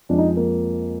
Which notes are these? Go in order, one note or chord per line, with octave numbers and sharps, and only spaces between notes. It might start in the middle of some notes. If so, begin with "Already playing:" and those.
F2 F3 G#3 D4
D#4
A#3